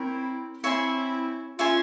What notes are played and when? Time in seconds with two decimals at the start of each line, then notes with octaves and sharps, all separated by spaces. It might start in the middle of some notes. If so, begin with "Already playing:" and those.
Already playing: C4 E4 A#4 C#5 G5
0.64 C4 E4 C#5 E5 G#5 C6
1.58 C#4 F4 C#5 E5 G#5 C6